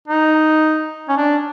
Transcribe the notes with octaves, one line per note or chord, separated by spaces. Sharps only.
D#4
C#4
D4